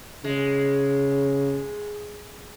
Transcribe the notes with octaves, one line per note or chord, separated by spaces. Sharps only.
C#3 G#3